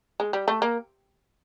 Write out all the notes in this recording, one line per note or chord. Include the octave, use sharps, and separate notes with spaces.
G#3
G3
A3
A#3